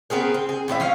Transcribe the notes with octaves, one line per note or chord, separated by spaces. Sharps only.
B3 C4 G#4 A#4
C4
G#4
A2 C4 G4 E5
F3 C#4 F5